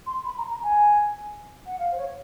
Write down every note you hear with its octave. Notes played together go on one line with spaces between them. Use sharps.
C6
B5
A#5
A#5
G#5
F#5
F5
C5
C#5